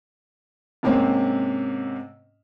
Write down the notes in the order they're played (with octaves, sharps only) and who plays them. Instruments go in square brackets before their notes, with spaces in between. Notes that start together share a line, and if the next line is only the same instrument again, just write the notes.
[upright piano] G#2 C3 A#3 C4 C#4